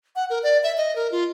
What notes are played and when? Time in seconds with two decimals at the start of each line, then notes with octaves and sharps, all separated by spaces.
0.16 F#5
0.30 A#4
0.43 D5
0.63 E5
0.78 D#5
0.96 A#4
1.12 F4